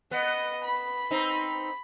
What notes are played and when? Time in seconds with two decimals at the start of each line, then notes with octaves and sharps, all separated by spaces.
0.11 B3 D#5 F#5
0.63 B5
1.11 C4 D#4